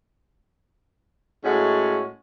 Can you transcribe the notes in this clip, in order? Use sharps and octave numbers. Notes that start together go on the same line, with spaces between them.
A2 G#3 C#4 F#4